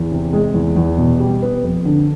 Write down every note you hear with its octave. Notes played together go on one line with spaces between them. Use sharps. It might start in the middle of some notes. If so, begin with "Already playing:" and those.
Already playing: E2
C3
G#3
E2
E2
B2
G3
B3
F2
D3